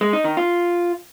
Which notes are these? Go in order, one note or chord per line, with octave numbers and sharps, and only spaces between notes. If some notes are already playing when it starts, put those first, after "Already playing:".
G#3
D#4
D#3
F4